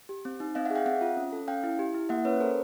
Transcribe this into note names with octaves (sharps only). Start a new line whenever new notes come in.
G4
C4
D#4
C4 D#5 F5
E5 F#5
G#4
F5 G5
C4 E5 F#5
F4
C#4
A4
C#4 F5 G5
E4
G4
E4
A#3 E5 F#5
C#4 B4 C#5
A4 A#4 C5